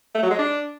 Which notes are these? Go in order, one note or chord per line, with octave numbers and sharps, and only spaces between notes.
A3
F#3
G#3
D4